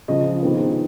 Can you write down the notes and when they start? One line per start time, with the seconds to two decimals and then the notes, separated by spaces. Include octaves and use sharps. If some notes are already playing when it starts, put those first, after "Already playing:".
0.08 C#2 C#3 F3 D#5
0.43 F2 C3 D#3 G#3 B3